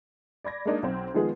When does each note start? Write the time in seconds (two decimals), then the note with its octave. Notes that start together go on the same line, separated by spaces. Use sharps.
0.44 D5 B5 G#6 A#6
0.65 G#3 A#3 D4 D#4
0.83 B1 C4
1.14 D#3 F3 G#3 B3 G#4